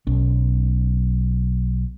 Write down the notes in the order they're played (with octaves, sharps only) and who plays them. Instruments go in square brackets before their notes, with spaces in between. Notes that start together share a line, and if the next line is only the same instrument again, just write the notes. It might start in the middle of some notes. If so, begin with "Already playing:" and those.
[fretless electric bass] B1 C#4